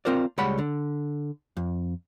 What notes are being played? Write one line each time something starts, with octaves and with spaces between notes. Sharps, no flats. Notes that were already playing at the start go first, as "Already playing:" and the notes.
C4 F4 A#4 C5 D5
C#2 G3 G#3 C#5 F#5 B5
D3
F2